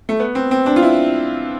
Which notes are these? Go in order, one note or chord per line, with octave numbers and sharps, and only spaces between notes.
A3
B3
C4
C4
D4
F4
E4